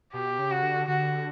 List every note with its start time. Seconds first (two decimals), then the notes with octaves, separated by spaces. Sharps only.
0.13 B2 G4
0.39 C#3
0.51 F#4
0.63 D3
0.88 D3 F#4